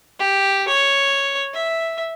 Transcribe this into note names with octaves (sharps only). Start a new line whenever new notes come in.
G4
C#5
E5